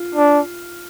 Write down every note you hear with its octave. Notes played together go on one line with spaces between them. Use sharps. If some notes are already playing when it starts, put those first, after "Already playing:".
Already playing: F4
D4